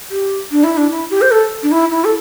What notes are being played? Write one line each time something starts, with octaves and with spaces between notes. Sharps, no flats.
G4
D4
E4
D4
E4
G4
C5
A4
D4
E4
E4
A4